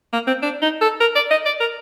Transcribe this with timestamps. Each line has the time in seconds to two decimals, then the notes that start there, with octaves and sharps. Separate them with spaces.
0.13 A#3
0.27 C4
0.42 D4
0.62 D#4
0.81 A4
1.00 A#4
1.15 D5
1.31 D#5
1.45 D5
1.60 A#4